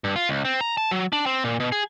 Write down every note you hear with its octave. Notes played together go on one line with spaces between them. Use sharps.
G2
F4
C#2
C4
A#5
A5
F#3
D4
C4
A#2
B2
G#4